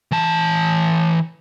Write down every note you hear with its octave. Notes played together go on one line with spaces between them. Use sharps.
E3 A5